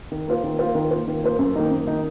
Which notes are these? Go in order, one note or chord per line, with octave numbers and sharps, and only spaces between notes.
D#3
A#3 F4 C5
D#3
A#3 F4 C5
D#3
A#3 F4 C5
D#3
A#3 F4 C5
F#2
D#3 A#3 D#4
F#2
D#3 A#3 D#4